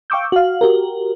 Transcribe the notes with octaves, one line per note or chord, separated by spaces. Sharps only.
F5 G5 C#6 D6 E6 G6
F#4 F5
F#4 G4 A#4